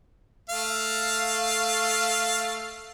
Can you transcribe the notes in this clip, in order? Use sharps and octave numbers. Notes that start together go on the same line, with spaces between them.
A3 F5